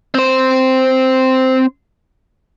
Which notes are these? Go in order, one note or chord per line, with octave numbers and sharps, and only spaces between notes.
C4 C5